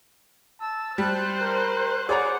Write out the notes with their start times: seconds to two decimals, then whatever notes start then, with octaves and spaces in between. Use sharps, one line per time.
0.61 A5 E6
0.98 G3 C5 F#6
1.41 A#4
2.09 G#4 C#5 D5 F#5 A#5